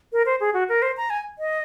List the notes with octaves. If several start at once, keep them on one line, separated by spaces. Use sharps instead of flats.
A#4
C5
G#4
F#4
A#4
C5
A#5
G#5
D#5